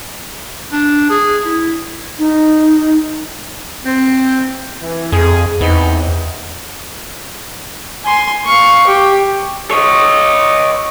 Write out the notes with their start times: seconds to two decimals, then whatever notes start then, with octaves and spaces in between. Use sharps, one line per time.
0.72 D4
1.10 G#4
1.45 E4
2.19 D#4
3.86 C4
4.80 E3
5.12 F2 G#4
5.61 E2 B3 C4 D#4
8.05 G#5 C6
8.46 F5 C#6
8.88 G4
9.71 C#5 D#5